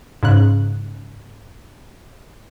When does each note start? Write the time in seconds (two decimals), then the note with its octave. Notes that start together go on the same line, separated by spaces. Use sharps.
0.23 G#2 C#3 F#6